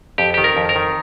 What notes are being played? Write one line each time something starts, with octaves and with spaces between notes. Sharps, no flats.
F2 G4
D#3 G4
A#4
F2
A#4
D#3